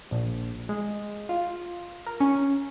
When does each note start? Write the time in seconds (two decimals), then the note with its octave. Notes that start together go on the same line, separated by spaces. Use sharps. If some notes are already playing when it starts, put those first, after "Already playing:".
0.11 A#1
0.69 G#3
1.29 F4
2.06 A#4
2.20 C#4